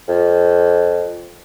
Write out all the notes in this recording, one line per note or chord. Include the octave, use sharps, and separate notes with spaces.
F2